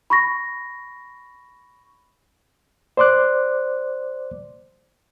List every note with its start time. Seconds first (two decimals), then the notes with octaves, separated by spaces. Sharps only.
0.10 B5 C#6 A#6
2.97 C5 D5 C6 D6 F#6